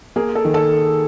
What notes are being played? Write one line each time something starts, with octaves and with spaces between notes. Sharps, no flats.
A#3 G#4
A4
D#3
A4